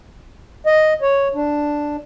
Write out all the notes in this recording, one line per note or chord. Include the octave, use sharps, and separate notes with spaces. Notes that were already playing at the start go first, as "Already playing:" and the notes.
D#5
C#5
D4